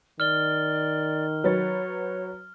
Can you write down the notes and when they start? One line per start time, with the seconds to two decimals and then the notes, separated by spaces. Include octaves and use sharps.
0.20 D#3 D5 F6 G7
1.44 F#3 B4 C#5 A6